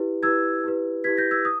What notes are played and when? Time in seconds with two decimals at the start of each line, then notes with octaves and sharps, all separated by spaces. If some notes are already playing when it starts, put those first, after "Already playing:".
Already playing: E4 G4 B4
0.22 E4 G4 B4 E6 G#6
0.64 E4 G4 B4
1.04 E4 G4 B4 G#6 B6
1.17 G6 A#6
1.31 E6 G#6
1.45 D#6